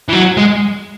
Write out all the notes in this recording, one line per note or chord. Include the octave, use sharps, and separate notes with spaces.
E3
F#3
G#3